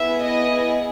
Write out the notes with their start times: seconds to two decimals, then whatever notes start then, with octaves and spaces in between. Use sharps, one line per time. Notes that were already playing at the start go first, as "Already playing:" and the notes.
Already playing: B3 E4 G#4 E5
0.25 D#5